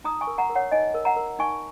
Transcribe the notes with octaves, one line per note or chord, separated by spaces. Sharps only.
D#4 A#5 D#6
G#5 C#6
A#4
F#5 A#5
A#4
C#5 F#5
D#4 D#5 G#5
A#4
F#5 A#5
A#4
D#4 G#5 C#6